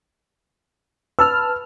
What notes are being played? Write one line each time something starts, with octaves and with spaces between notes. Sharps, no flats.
B4 A5 E6 F6